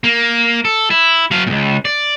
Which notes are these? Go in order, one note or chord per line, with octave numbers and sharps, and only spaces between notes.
A#3
A4
E4
F#3 F5
C#2 A#2
D5